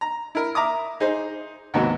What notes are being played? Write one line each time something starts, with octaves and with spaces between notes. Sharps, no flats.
A#5
E4 A#4
E5 A#5 D6 D#6
D#4 G#4 C5
D#2 G#2 C3 F#3 B3